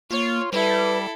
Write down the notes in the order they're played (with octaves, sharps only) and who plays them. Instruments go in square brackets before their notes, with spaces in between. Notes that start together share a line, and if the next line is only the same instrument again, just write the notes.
[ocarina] A#3 [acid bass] F4 [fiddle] C#5
[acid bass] G3 [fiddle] E4 A4 [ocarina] B4